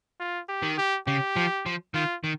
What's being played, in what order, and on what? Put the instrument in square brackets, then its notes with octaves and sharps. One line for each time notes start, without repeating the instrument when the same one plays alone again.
[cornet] F4
G4
[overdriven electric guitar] D#3
[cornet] G4
[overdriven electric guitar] C#3 [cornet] G4
[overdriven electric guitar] F3
F3
[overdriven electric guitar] D#3 [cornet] F4
[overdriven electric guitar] D#3